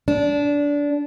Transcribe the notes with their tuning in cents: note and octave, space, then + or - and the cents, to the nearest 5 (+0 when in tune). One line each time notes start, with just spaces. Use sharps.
D4 -20